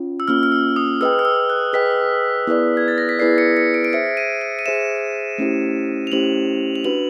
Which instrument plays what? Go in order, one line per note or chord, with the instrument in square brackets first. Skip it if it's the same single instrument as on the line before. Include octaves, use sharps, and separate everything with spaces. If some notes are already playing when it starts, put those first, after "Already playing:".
Already playing: [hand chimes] C#4 F4
[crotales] E6
[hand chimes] A#3 C#4 F4 [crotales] F6
[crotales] F6
E6
D#6
[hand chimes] G#4 B4 D#5 G5 [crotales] E6
[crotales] F6
E6
F#6
[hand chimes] G#4 B4 D#5 G5 [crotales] B6
[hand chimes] B3 E4 G#4 B4 D5
[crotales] G#6
A6
A#6
B6
[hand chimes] B3 E4 G#4 B4 D5 [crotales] C7
[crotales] C#7
C#7
D7
D7
[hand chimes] G#4 C5 E5 [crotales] C#7
[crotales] D#7
D7
D#7
[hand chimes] G#4 C5 E5 [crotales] E7
[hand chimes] A3 C#4 E4 G4 C5
[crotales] F7
[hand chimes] A3 C#4 E4 G4 C5 [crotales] F#7
[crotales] F7
[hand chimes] D4 F#4 B4 [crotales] F#7